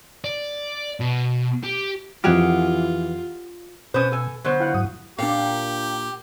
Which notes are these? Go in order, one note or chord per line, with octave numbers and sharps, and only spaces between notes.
D5
B2
G4
F2 E3 F4 G4 G#4 F#5 F6
B2 C#4 B4 C5 D#6
A4 G#5
D3 F#3 B3 C5
E4 F5 F#5
G#2 F#3 D#6
A#2 D4 G4 F5 G5